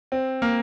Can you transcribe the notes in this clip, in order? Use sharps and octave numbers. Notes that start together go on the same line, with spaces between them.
C4
A#3